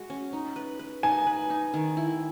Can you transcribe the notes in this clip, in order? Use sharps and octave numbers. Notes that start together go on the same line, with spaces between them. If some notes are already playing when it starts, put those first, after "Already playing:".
Already playing: G#3 F#4
C#4
D#4
B4
B4
D#4 G#5
B4
D#4
D#3
E4